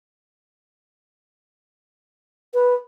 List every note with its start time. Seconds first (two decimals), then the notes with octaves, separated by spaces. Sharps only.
2.54 B4